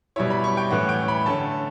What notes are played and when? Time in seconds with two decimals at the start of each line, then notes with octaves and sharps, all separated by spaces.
0.16 B2 G3 C#4 E4 C#5
0.30 B5
0.44 C#6
0.57 G5
0.70 A2 E3 A3 C#4 F#5
0.89 G5
1.08 B5
1.26 D3 A3 C#4 A5